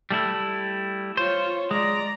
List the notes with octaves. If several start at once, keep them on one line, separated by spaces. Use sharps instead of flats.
G3 A3 E4
F4 C5 C#5
G#3 D5 A#5